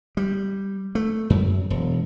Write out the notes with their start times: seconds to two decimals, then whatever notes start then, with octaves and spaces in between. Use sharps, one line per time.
0.17 G3
0.95 A3
1.30 F#2
1.70 E1